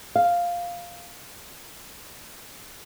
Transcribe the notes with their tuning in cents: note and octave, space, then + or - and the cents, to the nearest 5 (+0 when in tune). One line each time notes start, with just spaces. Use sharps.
F5 +0